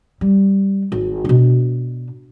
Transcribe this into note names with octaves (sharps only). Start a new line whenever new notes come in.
G3
G#1
B2 D4